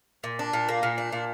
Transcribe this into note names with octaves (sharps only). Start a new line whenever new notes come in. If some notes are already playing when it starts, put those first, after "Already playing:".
A#2
D4
A#2
A#3
A#2
D4
A#2